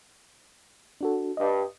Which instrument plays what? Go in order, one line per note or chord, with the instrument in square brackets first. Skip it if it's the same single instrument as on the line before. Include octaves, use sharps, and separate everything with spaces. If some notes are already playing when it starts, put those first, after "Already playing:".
[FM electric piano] D4 F#4 A4
[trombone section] G2 [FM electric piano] D#5